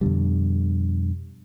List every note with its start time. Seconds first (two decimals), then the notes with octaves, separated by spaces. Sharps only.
0.01 F2 B2 D3 G3